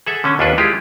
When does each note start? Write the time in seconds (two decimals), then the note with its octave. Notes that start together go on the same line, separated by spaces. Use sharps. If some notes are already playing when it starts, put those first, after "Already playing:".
0.06 G#4 A4 E5 F#5
0.24 D3 C#4
0.39 D#2 D4 F4 A4 B4 F#5
0.58 G#3 E4 F4 G4 G#4